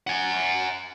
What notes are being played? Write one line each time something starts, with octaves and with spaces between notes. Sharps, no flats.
F#5 G#5